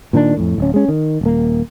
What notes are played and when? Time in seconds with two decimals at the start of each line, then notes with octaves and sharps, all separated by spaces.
0.13 A#2 D#3 C4 D4
0.37 F2 A2
0.58 D1 C#4
0.74 G#3 C#4
0.89 D#3
1.21 D#1 A#3